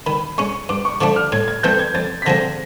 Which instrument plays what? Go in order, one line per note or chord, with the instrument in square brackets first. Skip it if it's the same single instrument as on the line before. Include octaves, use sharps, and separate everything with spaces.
[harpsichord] D#3 [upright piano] B5
[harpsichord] G#3 C#4 [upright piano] C#6
[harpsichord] G2 [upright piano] D6
[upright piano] C#6
[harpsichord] D3 F3 A3 D4 [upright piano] D6
[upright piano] F6
[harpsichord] A2 [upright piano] G#6
[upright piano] G#6
[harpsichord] E3 A3 C4 [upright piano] G6
[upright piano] G#6
[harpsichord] F2 [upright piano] A6
[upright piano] B6
[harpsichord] D3 F3 G#3 C4 [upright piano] A#6